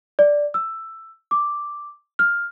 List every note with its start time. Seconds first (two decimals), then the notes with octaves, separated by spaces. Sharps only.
0.19 D5
0.54 E6
1.31 D6
2.19 F6